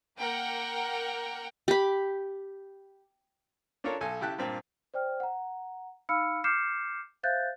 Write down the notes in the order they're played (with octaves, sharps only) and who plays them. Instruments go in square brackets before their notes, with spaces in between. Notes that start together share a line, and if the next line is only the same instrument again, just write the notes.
[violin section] A#3 A#4 F#5 G5
[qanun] G4 B5
[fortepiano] C#4 D4 F4 A4 A#4 C#5
B1 A4 G#5
C#3 E4 G4 G5 A5 F#6
G2 A#2 C4 G5
[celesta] C5 D5 G5 F6
F#5 A#5
D#4 F5 B5 E6 F6 C#7
D6 F6 G6 C7 C#7 E7
C5 E5 F5 F#6 G6 A6